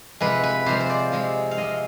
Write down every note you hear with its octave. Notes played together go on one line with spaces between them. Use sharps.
C3 F3 G#3 B4
B4
C3 F3 G#3 C5
C5
D5
C3 F3 G#3
F5
C3 F3 G#3 D#5